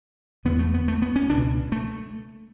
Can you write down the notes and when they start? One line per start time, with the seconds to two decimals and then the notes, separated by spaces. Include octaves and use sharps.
0.45 E2 D3 B3
0.59 A3
0.74 B3
0.88 A3
1.02 B3
1.16 C#4
1.30 C#2 B2 D4
1.72 A3